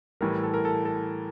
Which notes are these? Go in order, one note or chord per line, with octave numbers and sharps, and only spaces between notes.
A2 E3 G3 A#4
A4
A#4
A4
A4